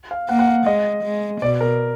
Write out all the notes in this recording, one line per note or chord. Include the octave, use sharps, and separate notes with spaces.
F5
A#3 F#5
F#5
F5
G#3 D#5
G#3
B2 D5
A#4